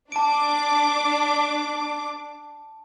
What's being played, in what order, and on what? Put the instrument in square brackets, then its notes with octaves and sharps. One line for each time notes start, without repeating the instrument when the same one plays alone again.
[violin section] D4 D6 [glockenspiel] A5 D7